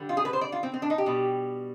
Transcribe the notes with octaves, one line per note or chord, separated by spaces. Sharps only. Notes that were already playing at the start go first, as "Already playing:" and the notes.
Already playing: D3 G3
F4
G#4
B4
C5
D5
F4
C4
C4
D4
D#4
G4
B2 G3